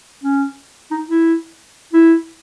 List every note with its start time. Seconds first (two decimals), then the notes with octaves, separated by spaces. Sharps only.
0.23 C#4
0.91 D#4
1.08 E4
1.93 E4